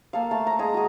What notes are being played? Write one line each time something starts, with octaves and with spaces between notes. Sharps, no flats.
A#3 A4 F5
A3 A5
A#5
G#3 G#4 A#5
F#4 G#4